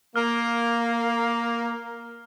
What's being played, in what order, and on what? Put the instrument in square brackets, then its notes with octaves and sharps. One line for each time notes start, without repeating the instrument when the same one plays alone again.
[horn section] A#3 [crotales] F6